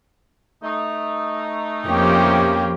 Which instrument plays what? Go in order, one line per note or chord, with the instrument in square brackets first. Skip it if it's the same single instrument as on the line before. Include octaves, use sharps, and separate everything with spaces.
[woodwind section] A3 D#4
[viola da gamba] F2 A#3 C#4 [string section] F3 G4